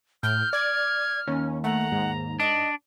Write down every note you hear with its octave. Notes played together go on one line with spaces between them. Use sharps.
A2 F6 G6
D5 G#6
D#2 C#4
A3 F#5 A#5
G#2
D4 D#5